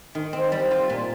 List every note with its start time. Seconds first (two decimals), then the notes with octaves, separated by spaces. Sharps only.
0.15 D#3
0.33 C4
0.52 G3
0.71 F4
0.90 A#2